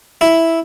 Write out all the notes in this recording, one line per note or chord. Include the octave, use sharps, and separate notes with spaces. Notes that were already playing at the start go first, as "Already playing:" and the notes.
E4